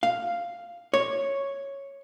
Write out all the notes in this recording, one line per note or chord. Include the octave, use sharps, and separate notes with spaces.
F5
C#5